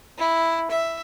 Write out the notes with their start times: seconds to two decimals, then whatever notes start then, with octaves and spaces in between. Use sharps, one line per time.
0.18 E4
0.71 E5